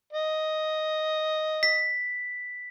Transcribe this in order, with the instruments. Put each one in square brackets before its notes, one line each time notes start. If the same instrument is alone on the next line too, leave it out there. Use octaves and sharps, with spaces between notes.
[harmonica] D#5
[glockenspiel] B6